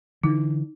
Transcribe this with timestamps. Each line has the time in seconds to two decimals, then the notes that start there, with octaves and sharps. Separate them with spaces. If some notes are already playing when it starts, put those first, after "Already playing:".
0.23 D3 E3 D#4